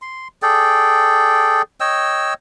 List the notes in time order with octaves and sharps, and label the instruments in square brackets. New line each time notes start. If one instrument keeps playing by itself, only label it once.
[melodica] C6
G#4 A4 D5 G5
C#5 D#5 G5 E6